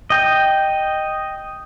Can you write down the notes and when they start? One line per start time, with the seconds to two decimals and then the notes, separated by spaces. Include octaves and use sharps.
0.10 D#5 G5